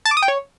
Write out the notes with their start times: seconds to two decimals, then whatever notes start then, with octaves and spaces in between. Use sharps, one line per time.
0.05 A5
0.11 D6
0.17 D#6
0.22 G5
0.28 C#5